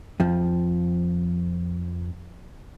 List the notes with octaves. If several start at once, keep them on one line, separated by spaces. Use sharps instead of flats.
F2 F3